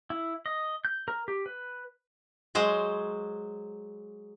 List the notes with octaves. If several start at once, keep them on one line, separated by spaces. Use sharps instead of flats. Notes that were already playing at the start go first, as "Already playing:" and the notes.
E4
D#5
G6
A#4
G4
B4
F#3 G#3 C5